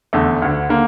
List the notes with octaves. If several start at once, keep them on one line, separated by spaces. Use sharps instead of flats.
F1 E2 D3 A3
D2 D3
D3 A#3